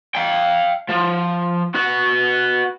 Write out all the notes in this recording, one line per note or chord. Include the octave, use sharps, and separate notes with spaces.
F5 G5
F3
B3 F#4